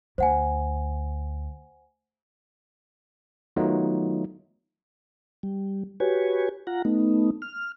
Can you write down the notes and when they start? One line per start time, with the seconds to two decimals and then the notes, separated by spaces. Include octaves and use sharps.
0.18 D2 C5 F#5 G#5
3.56 D#3 F#3 A3 B3 D#4 F4
5.43 G3
6.00 F#4 G4 B4 C#5 G#5
6.67 F4 F#5 A#5
6.85 A3 B3 D#4
7.42 F6